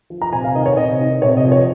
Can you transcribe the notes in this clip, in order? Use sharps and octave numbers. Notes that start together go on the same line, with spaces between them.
F3
A#5
C3 G#5
F5
D#3 D#5
C#5
C3 D#5
D#3
C3 C#5
D#5
F3
C#5